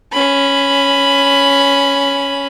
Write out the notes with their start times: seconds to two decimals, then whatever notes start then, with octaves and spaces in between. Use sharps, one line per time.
0.12 C#4 B5